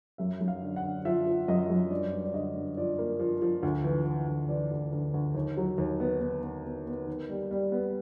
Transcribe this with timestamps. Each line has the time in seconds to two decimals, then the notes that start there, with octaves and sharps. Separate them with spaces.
0.18 F#2 E5
0.41 F#2
0.48 F5
0.62 D3
0.76 F#5
0.83 D3
1.05 F3 E5
1.27 F3
1.48 F#2 D#5
1.70 F#2
1.91 G2 D5
2.13 G2
2.24 D5
2.34 D3 D#5
2.56 G2
2.77 F3 D5
2.99 A#3
3.20 F3
3.42 F3
3.63 D2
3.84 E3
4.06 E3
4.28 D2
4.49 E3 D5
4.71 D2
4.92 D2
5.14 D2
5.35 D#2
5.57 F#3
5.78 D#2
6.00 B3
6.21 B3
6.43 B3
6.64 B3
6.86 B3
7.07 D#3
7.30 G3
7.51 G3
7.72 B3